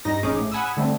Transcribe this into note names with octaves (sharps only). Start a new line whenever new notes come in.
G2 D#4 A#6
A#1 C#4 D#4 G#4 D6
A2
F#5 G#5 B5 D#6 E6
D3 G3 A3 C4